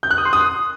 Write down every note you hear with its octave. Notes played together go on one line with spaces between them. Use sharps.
G6
F#6
D#6
C6
D#6